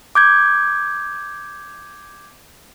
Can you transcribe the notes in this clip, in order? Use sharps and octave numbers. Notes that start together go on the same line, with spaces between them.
D6 G6 G#6